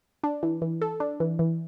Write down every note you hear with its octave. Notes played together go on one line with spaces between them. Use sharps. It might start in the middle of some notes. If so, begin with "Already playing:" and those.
D4
E3
E3
A4
D4
E3
E3